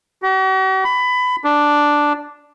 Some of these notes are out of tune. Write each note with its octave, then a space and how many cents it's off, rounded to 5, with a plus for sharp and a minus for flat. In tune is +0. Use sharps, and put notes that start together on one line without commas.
F#4 +45
B5 +20
D4 +0